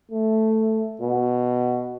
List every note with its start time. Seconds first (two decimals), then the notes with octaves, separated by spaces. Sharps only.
0.11 A3
1.01 B2